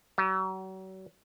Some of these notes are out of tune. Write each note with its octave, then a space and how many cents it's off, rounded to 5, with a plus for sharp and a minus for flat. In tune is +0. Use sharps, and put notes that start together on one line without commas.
F#3 +40